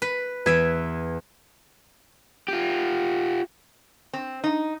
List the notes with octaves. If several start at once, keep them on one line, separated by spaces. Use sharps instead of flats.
B4
E2 B4 E5 G#6 D7
F4 G4
C4
D#4